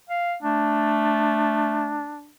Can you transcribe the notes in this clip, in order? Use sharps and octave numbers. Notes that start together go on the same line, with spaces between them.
F5
A3 D4